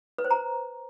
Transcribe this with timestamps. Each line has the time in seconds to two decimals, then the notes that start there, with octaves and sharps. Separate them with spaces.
0.18 B4
0.25 C5
0.31 A#5